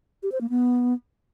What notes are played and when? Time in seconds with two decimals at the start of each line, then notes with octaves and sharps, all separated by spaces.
0.23 G4
0.32 C5
0.41 A#3
0.50 B3